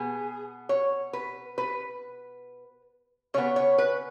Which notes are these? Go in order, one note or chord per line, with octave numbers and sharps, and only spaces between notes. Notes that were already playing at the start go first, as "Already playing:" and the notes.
Already playing: B2 B3 G#4
C#5
B4
B4
C#3 B3 C#5
C#5
B4